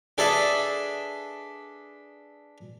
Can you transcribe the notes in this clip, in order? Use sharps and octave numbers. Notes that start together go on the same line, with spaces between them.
D4 G#4 A4 B4 D#5 E5